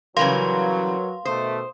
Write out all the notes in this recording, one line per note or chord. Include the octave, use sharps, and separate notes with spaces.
C#3 E3 F#3 G3 A#4 B4 F5 C6
B2 D#3 A3 C5 D#6